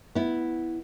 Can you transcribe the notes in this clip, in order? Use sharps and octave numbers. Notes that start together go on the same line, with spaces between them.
B3 E4